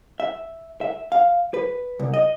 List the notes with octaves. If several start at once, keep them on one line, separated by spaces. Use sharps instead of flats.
E5
E5
F5
B4
C2
D#5